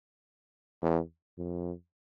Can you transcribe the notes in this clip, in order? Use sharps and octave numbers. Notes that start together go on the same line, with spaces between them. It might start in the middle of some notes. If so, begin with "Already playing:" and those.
E2
F2